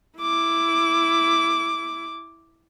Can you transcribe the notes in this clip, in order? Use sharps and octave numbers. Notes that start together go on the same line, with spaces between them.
E4 D6